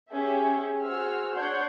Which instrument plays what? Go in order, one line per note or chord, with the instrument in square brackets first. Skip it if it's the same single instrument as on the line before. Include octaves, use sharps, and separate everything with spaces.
[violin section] C#4 G4 G#4 E5
F#4 G#4 C5 E6 F6
D4 C#5 F#5 C6 G6 G#6